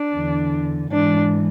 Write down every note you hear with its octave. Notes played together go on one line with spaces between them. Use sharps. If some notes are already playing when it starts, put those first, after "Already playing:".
Already playing: D4
E2 D3
G#2 E3 D4